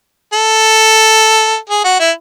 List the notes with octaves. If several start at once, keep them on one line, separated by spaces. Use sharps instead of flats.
A4
G#4
F#4
E4